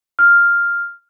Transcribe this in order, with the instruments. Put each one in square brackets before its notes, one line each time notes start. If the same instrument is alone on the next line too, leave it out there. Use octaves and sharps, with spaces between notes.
[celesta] F6